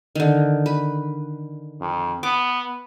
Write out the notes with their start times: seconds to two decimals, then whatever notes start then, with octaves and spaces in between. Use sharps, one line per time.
0.15 D3 D#3
0.66 B4
1.81 F2
2.23 B3 D6